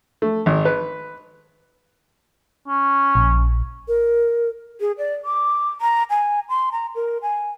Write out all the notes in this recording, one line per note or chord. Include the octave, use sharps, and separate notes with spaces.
A3
G#1
B4
C#4
A#1
A#4
G#4
D5
D6
A#5
G#5
C6
A#5
A#4
G#5